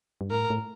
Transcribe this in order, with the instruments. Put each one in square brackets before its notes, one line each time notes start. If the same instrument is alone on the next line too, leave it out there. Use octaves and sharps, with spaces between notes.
[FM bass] G2
[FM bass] A2 [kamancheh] A#4
[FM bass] A2